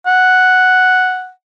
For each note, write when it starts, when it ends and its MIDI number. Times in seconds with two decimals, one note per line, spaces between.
0.07 1.30 78